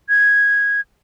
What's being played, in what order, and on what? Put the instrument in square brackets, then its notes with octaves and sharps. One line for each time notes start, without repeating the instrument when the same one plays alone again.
[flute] G#6